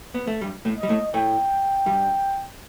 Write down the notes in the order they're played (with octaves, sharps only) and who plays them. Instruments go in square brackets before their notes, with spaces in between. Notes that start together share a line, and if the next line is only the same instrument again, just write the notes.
[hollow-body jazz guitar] B3
A3
G2 G3
A2 A3
[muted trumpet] D#5
[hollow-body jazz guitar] G3
A2 A3
[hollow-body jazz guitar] A2 A3 [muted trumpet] G5
[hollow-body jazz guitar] G2 G3